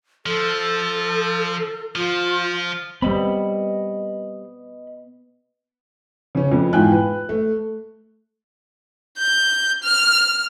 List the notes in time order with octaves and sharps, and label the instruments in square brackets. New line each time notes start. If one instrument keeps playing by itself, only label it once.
[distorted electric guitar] F3 [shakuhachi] A4
[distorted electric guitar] F3 [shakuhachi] F4
[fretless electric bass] G3 C4 [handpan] B3 [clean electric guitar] D#5 B5
[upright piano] C#3 C#4
F2 B3
G#2 E3 F4 G5 G#5 F#6
B4
A3
[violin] G6
F6